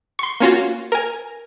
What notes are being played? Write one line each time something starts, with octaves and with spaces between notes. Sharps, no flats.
C6 C#6
A#3 C#4 F4 F#4
A#4 G#5